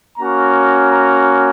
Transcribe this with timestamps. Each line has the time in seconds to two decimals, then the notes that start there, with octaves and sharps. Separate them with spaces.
0.18 A#3 C#4 F#4 A#5
0.90 A#5